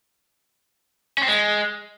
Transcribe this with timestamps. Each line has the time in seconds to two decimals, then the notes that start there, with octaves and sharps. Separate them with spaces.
1.18 C#4
1.23 C4
1.28 G#3